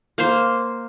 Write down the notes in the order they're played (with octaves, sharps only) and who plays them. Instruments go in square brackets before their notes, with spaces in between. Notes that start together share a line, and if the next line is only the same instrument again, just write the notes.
[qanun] A#3 C5 C6